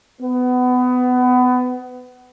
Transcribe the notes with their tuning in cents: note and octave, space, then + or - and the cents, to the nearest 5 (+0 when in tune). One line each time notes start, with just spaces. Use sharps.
B3 +25